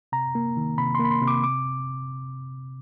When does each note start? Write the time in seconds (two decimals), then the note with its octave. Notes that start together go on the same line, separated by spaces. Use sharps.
0.12 C3 A#5
0.35 A#3
0.57 D#3
0.78 C3 B5
0.95 A#3 C6
1.05 B5
1.11 C6
1.22 C3
1.28 D6
1.43 D6